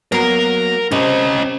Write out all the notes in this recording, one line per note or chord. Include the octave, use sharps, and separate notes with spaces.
F#3 A#3 B3 A#4 A#5
C3 C#4 D#5